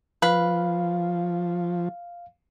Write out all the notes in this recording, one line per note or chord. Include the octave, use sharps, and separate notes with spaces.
F3 B4 F5